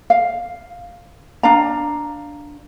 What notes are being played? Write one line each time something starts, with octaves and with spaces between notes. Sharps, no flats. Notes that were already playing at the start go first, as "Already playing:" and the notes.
F5
D4 F5 A#5